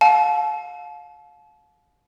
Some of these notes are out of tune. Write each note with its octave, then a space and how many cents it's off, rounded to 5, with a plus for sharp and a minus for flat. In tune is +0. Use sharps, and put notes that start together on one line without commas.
F5 +30 A5 -35